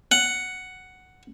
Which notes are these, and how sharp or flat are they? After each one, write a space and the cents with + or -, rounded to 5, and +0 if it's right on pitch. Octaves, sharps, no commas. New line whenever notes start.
F#5 +5